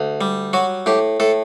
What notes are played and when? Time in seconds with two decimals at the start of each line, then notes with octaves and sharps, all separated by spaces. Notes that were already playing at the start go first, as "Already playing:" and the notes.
Already playing: D2
0.21 G3
0.53 F#3 F#4
0.86 A2 G4
1.20 A2 A4